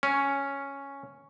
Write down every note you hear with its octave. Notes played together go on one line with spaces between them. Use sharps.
C#4